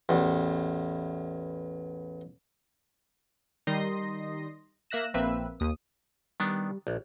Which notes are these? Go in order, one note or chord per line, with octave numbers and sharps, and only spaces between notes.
A1 E2
D#3 G3 D#4 C6 D#6 A#6
A#3 E5 F#6 A#6 E7
A#1 A#3 C4 B4 E5
D#2 D#6
D#3 G3 B3 D4
A#1